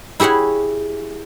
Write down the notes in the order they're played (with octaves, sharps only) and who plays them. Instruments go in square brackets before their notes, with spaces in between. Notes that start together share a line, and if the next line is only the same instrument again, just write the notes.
[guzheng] E4 G4 G#4 C#5 F#5